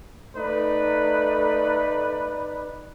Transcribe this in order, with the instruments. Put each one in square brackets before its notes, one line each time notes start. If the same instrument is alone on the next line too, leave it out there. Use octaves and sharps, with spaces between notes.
[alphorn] A3 [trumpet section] D#4 B4 D5